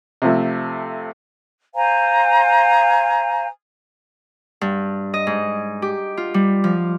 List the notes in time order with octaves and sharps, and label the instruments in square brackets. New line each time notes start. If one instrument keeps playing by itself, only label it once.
[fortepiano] C3 F3 A3
[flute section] C5 F5 G#5 A#5
[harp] G2
D#5
G#2
G4
F4
G3
F3